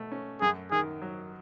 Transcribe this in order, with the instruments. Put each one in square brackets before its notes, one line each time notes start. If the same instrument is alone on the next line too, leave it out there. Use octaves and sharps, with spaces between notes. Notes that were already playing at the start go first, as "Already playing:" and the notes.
Already playing: [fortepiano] B2 A3
C#4
[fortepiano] F#2 [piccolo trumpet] G#4
[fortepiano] D#3 [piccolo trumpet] G#4
[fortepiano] F#3